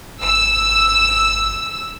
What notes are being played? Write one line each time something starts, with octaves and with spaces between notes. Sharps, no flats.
G#1 E6